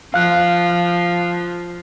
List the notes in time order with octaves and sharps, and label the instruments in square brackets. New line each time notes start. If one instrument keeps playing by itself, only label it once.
[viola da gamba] F3 [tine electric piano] F5 F#6